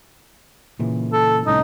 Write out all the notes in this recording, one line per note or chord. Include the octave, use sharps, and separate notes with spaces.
A#2 C#3 E3
A4
C2 A2 C#4 D#4